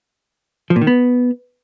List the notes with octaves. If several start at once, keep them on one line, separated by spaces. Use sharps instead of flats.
F3
A#2
D#3
B3